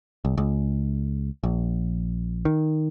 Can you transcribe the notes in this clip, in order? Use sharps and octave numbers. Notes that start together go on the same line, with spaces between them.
C2
C#2
A#1
D#3